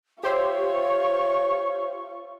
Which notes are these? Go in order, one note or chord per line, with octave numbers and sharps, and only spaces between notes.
F4 G4 C5 C#5 E5 C#6